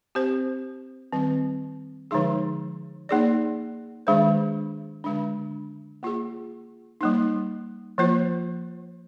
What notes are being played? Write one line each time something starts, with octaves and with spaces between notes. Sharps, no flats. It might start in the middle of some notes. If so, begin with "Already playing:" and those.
C4 G4 C5
D#3 G3 C4
D3 F3 G#3 D#4 G#4
A#3 D#4 G#4 D5
D#3 G#3 D4 G#4 C5
D3 G#3 D4
A#3 F4 G#4
G3 A#3 D#4
F3 A#3 F4 C5